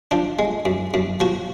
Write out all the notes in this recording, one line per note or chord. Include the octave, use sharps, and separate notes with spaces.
F3 D4
G#3
F#2
F#2
F3 F#4